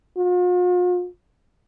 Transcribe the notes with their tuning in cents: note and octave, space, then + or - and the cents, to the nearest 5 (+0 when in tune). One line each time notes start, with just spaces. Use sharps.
F4 +45